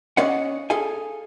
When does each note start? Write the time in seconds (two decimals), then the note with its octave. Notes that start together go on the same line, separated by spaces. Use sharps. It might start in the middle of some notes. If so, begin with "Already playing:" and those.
0.17 C#4 D5 D#5 F5 F#5
0.70 G#4 A4 F5 G#5